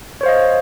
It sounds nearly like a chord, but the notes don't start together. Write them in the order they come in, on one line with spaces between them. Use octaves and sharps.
C#5 C5 F5 D#5